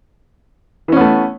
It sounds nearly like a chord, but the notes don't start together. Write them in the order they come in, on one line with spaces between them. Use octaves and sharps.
E3 C#4 B3 A3